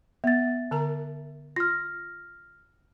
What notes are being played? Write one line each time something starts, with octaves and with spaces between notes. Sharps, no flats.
B3 E5 A6
D3 A#4 A#5
F4 F6 A#6